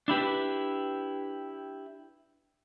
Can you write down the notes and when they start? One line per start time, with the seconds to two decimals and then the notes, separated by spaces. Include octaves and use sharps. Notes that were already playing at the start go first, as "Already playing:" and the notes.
0.08 D4 E4 G4 B4